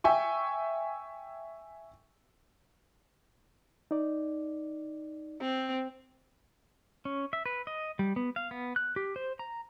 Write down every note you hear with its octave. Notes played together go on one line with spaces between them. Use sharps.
E5 G5 G#5 C#6
D#4 D5
C4
C#4
E5
B4
D#5
G3
B3
F5
B3
F#6
G4
C5
A#5